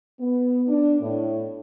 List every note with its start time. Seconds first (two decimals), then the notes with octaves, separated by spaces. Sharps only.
0.20 B3
0.68 D4
1.02 A2